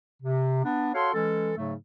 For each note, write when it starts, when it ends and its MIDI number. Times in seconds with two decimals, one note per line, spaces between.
0.22 0.60 48
0.64 0.90 59
0.64 0.90 62
0.94 1.09 66
0.94 1.09 69
0.94 1.09 73
0.94 1.09 77
0.94 1.09 78
0.94 1.09 84
1.14 1.52 52
1.14 1.52 56
1.14 1.52 61
1.14 1.52 69
1.57 1.74 44
1.57 1.74 49
1.57 1.74 54
1.57 1.74 57